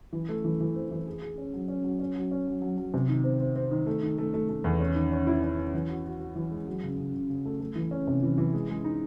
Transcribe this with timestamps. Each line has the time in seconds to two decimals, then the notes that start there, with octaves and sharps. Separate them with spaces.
0.13 E3
0.29 A3
0.44 E3
0.61 E3
0.76 C4
0.91 E3
1.07 G#4
1.22 G#4
1.38 C#4
1.54 F#3
1.68 C#4
1.84 F#3
1.99 C#4
2.16 F#3
2.31 C#4
2.47 F#3
2.62 F#3
2.78 F#3
2.94 C3
3.09 D#3
3.24 C4
3.40 C4
3.56 C4
3.71 D#3
3.87 A3
4.03 D#3
4.18 A3
4.34 A3
4.49 A3
4.64 E2
4.80 C#4
4.95 D#3
5.12 C#4
5.27 E4
5.42 C#4
5.58 C#4
5.74 E3
5.89 F#4
6.05 F#4
6.20 F#4
6.35 E3
6.51 G#3
6.67 F#3
6.83 C#3
6.98 C#3
7.14 C#3
7.30 C#3
7.45 A3
7.60 A3
7.75 E3
7.91 C#4
8.07 C3
8.23 E3
8.38 E3
8.54 G#3
8.70 G#3
8.84 D#4